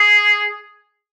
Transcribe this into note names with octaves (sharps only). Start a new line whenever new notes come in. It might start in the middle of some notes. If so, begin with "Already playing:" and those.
Already playing: G#4